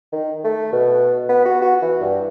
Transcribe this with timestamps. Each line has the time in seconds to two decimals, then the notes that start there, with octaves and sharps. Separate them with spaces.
0.13 D#3
0.45 A3
0.73 B2
1.29 B3
1.45 F#4
1.62 F#4
1.82 E3
2.01 G2